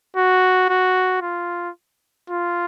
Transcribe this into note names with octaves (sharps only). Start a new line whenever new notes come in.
F#4
F#4
F4
F4